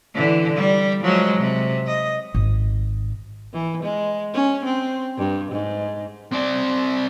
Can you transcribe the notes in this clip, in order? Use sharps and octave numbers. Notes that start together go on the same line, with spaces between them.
D3 E3
G3
F3 F#3 G#3
C3
D#5
G#1
E3
G#3
C#4
C4
G2
G#2
C4 D5